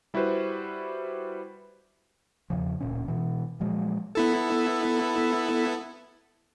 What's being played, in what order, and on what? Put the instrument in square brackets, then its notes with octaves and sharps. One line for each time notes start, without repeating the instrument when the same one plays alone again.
[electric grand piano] G3 E4 F#4 G4 B4 C5
[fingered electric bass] E2 C#3 F3
D1 A#2 C#4
B2 E3
A#2 F3 F#3 G#3
[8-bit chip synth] B3 E4 A4